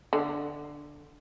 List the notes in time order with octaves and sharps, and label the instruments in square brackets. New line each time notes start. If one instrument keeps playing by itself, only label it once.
[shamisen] D3